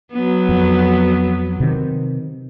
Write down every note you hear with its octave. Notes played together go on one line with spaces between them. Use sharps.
F#3 B3
F2
C3 D#3